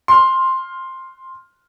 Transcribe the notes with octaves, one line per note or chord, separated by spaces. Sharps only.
C6 F6